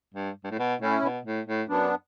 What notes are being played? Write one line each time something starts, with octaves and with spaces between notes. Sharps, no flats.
G2
G2
A2
B2
A2 C#4 E4
B2
A2
A2
F#2 B3 D4